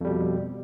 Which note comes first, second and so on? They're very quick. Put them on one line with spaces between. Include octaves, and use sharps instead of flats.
F2 G3 B2